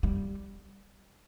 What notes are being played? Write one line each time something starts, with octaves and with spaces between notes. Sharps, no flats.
G3